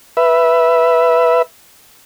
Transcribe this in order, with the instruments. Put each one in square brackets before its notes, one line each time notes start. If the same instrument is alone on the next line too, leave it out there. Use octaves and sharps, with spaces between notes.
[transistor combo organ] B4 E5